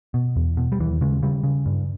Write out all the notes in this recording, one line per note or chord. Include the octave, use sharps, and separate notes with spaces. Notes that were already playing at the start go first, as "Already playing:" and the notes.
B2
E2
B2
G3
D#2 E3
C#3 G#3
C#3 G3
C#3
G2